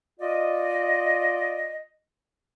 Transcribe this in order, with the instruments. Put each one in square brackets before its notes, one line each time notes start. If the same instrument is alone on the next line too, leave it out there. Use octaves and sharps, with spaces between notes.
[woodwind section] F4 D5 D#5